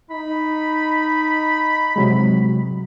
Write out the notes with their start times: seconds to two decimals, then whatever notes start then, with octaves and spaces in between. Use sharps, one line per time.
0.11 D#4 B5
1.96 C3 F#3 G#3